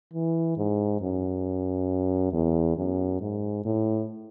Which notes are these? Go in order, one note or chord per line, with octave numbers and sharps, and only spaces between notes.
E3
G#2
F#2
E2
F#2
G#2
A2